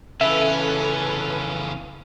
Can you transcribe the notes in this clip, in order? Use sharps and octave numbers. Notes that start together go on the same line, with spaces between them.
C#3 E3 C#4 A4 B4 E5